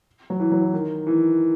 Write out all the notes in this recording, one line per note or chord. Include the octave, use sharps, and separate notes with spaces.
F#3
E3
F#3
E3
D#3
E3